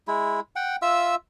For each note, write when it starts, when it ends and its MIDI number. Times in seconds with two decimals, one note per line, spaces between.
0.07 0.40 56
0.07 0.40 64
0.56 0.76 78
0.56 0.76 79
0.82 1.15 65
0.82 1.15 76
0.82 1.15 88